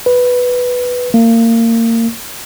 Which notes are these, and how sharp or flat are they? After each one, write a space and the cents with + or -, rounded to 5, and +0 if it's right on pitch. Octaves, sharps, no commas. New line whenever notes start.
B4 +0
A#3 -30